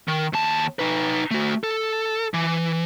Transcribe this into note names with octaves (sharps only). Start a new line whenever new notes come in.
D#3
D#2 A5
D#4 B4
A3 F#4
A4
E3